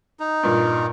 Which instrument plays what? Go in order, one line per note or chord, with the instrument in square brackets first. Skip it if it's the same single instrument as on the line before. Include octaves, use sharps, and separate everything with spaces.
[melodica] D#4
[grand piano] G2 A#2